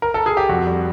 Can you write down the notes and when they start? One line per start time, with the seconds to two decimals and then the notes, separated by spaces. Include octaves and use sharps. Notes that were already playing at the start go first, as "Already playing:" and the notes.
0.02 A#4
0.14 A4
0.26 G#4
0.37 G4
0.49 F2 F#4
0.67 G3